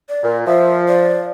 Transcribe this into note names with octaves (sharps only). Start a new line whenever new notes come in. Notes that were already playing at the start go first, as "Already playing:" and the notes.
D5
A#2
F3 E5
D5